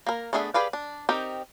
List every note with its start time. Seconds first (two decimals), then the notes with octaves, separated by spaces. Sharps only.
0.07 A#3 A#4
0.33 A3 B3 D4 G#4 E5
0.54 G4 G#4 B4 D5 F5
0.73 D4
1.09 C4 D#4 G4 A#4